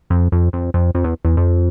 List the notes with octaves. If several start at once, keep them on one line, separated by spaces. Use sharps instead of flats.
F2
F2
F2
F2
F2
E2
E2
F2